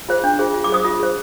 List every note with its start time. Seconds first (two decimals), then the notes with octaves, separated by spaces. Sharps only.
0.09 F4 G#4 C5
0.24 D4
0.39 F4 G#4 C5
0.54 F4
0.64 D6
0.69 G#4 C5 D#6
0.85 F4
0.99 G#4 C5